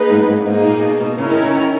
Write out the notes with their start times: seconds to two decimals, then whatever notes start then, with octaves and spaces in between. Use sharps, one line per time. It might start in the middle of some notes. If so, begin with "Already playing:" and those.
Already playing: A#3 D#4 G#4 B4
0.10 G#2
0.18 F#2
0.27 G#2
0.36 F#2
0.46 G#2 A#3 D#4 G#4
0.64 A#2
0.82 B2
1.00 B2
1.18 C#3 C#4 E4 A#4 C#5
1.31 D#3
1.43 C#3
1.55 D#3